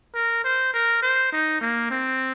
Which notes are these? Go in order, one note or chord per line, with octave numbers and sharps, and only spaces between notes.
A#4
C5
A#4
C5
D#4
A#3
C4